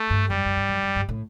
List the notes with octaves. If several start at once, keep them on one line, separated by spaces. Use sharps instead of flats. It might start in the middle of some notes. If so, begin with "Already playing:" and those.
Already playing: A3
G2
F#2 G3
F#2
G2
F#2
F#2
G2
A2